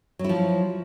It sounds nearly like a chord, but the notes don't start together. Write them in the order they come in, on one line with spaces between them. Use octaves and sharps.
F#3 E4 F3